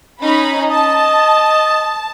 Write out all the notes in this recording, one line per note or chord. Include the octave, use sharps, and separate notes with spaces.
C#4 D#4 B5
D#5 A5